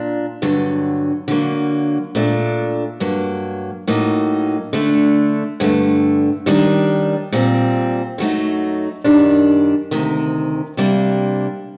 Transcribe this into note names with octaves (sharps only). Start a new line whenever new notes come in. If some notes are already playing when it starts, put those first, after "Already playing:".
Already playing: A#2 D4
G2 D3 F#3
D3 F#3 A#3
A#2 A3 D4
G2 F#3 A#3
A2 F#3 A#3 D#4
D3 A3 D4
G2 D3 A3
D#2 D#3 G3 D4
A#2 G3 C4
F#2 F#3 A3 D#4
F#2 D#3 G3 D4
D2 C3 D#3
C3 G3 A#3 D4